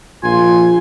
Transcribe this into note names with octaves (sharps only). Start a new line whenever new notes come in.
A#1 F4 G#5 C6